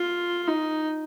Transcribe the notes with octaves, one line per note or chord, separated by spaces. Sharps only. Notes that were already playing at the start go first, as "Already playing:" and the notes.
Already playing: F4
D#4